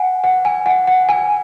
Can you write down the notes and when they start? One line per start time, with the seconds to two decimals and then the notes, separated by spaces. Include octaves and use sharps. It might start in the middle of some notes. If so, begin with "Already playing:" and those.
Already playing: F#5 G#5
0.24 F#5
0.45 G#5
0.66 F#5
0.87 F#5
1.09 G#5